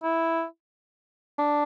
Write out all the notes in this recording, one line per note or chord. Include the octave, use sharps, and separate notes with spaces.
E4
D4